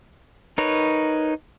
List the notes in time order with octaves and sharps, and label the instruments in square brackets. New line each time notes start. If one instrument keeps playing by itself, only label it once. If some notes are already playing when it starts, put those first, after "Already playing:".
[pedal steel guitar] D#4 A#4 B4 C#5